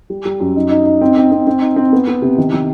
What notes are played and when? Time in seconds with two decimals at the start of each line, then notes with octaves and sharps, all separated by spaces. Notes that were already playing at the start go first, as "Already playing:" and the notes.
0.10 G3
0.25 G3
0.40 F#2
0.56 D#4
0.71 D#4
0.85 D#4
1.01 C4
1.17 C4
1.32 C4
1.47 C4
1.61 D#4
1.76 C4
1.93 B3
2.07 B3
2.22 C3
2.38 D#3
2.53 D#3